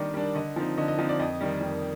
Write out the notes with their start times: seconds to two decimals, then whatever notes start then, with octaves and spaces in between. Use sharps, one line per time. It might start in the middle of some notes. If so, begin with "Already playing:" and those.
Already playing: D#3 G3 D4 D5 D#5
0.14 G3 D4
0.35 D3 D#5
0.56 F3 C4 D#4
0.78 D3 D#5
0.88 D#5
0.98 F3 C4 D#4 D#5
1.09 D5
1.19 F2 D#5
1.41 D#3 G3
1.61 F2